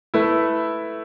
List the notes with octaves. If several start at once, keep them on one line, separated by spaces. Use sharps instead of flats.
A3 E4 B4